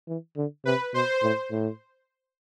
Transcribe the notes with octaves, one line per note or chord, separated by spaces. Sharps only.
E3
D3
C3 B4
B2 C5
A2
A2